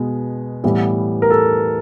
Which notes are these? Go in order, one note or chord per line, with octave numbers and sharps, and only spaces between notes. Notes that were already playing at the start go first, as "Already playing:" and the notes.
Already playing: B2 G#3 B3
A2 E3 G3 B3
A#4
A4